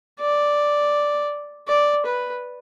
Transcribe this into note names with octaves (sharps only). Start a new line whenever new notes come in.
D5
D5
B4